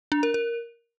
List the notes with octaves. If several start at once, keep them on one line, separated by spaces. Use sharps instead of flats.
D4
A#4
A#4